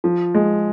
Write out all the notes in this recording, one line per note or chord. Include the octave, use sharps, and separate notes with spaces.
F3
G#3